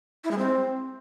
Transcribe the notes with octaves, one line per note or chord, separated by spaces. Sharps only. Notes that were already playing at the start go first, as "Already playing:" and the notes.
E4
G#3
C4